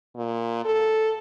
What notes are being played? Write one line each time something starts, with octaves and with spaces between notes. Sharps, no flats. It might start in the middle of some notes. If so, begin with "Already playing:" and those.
A#2
A4